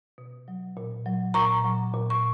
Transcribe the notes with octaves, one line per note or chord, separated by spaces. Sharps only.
B2
F#3
A#2
F#3
A#2 A#5 C#6
F#3
A#2
C#6